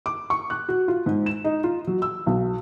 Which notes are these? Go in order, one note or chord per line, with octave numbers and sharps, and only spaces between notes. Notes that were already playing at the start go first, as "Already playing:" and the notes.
D6
C#6
F#6
F#4
F4
G#2
E7
D#4
F4
F#3
E6
B1